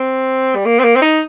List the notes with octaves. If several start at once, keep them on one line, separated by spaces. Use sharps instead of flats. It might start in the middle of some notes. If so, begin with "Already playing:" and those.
Already playing: C4
G3
A#3
C4
A#3
C4
D#4